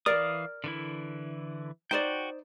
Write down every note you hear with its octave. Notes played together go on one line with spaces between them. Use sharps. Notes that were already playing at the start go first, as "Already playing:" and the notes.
E3 A#4 D5 F5 D#6
D3 E3 E4
D#4 F#4 C5 D5 G5